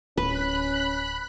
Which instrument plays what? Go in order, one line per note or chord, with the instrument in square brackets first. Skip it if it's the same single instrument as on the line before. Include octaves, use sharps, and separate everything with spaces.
[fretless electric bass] D1 [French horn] C#4 [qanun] B4 [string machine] B5 F#6